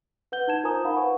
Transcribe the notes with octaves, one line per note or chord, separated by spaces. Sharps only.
B4 F#5 G6 G7
D#4 A5 G#6 E7
F4 A#4 C5 G#5 A#5 D#6
D#4 F5 F#5 B5
B4 F#5 G#5 C#6